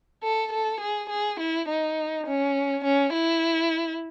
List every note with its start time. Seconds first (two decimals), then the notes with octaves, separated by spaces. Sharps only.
0.23 A4
0.52 A4
0.80 G#4
1.09 G#4
1.40 E4
1.69 D#4
2.26 C#4
2.84 C#4
3.13 E4